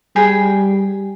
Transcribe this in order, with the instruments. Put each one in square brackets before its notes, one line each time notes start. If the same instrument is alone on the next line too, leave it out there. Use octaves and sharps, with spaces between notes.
[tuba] G3 [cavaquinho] G#4 G5 B5